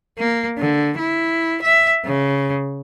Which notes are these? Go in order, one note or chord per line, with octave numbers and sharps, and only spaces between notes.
A#3
D3
E4
E5
C#3